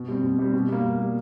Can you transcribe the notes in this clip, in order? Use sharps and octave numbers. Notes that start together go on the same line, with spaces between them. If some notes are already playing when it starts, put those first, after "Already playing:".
Already playing: B2
G3 C4
B2
G3 C4
B2
G3 A#3
B2
G3 A#3